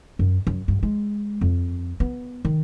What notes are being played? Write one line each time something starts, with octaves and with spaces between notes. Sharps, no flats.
F#2
F#2
G2
G#3
F2
B3
D#3